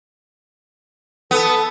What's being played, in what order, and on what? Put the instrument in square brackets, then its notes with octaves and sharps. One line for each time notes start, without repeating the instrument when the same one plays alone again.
[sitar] B3 [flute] A4